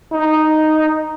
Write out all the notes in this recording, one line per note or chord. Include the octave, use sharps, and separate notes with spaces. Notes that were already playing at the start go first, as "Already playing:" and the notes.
D#4